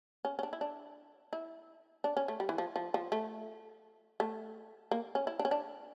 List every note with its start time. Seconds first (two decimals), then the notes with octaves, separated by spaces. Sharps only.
0.25 C#4
0.39 C#4
0.43 D4
0.53 E4
0.61 D4
1.33 E4
2.04 D4
2.17 C#4
2.28 A3
2.40 G3
2.49 E3
2.58 F3
2.76 F3
2.94 F3
3.12 A3
4.20 A3
4.91 A#3
5.15 C#4
5.27 E4
5.39 D4
5.45 C#4
5.51 D4